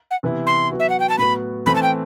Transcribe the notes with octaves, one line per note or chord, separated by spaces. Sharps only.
F#5
C3 E3 B3 E4
C6
F#3 B3 F#4
E5
F#5
G5
A5
A2 F#3 B3 F#4 B5
E3 A3 C4 B5
A5
G5